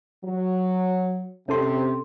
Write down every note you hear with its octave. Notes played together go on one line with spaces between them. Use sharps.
F#3
C3 C#4 A4 C6